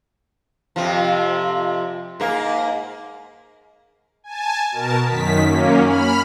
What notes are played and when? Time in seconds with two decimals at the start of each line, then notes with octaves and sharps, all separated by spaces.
0.76 F2 C3 F3
2.20 G#2 A#3
4.24 G#5 A5
4.72 B2 A#4 A5
5.06 F#2 D#3 B6
5.44 F#2 A#3 C#4
5.82 B5 F6